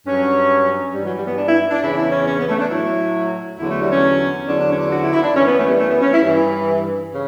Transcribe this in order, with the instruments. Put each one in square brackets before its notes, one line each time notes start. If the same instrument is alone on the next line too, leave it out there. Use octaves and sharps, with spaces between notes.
[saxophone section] G2 F#3 C#4
G2 E3 G3
F#3
G3
B3
D4
E4
D4
E2 C#3 E3 E4
E4
C#4
C#4
B3
A3
D4
A2 F#3 E4
E2 D3 F#3 E4
A3
G3
C#4
E2 D3 F#3 D4
D4
C#4
D4
F#4
E4
E4
D4
F#2 E3 C#4
B3
A3
G3
A3
B3
C#4
E4
G2 E3
C#3